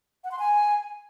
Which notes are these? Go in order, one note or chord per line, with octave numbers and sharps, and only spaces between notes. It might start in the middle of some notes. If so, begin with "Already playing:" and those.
F#5
C6
G#5